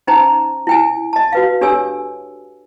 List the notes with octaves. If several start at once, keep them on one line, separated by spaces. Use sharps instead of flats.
C#4 D#4 C5 G5 A#5
E4 G5 G#5
D#5 A5
F#4 B4 F5
D4 G4 A4 C#5 G#5 E6